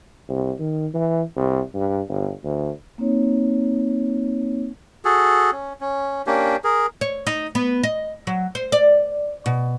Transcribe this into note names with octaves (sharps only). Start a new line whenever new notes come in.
C2
D#3
E3
C2
G2
G1
D2
A#3 C4 D#4 C#5
F#4 G#4 A4
C#4
C#4
A#3 C#4 D4 G4
G#4 A#4
C#5
D#4
B3
D#5
F#3
C5
D5
B2